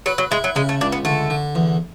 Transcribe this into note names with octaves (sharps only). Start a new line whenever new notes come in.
F#3 B4
F#3
G#3 E4
F#3
C#3 G#3
A3
C#2 D4
B3
D3 A3
D3
E2